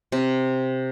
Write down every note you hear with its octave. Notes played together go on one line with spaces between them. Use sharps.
C3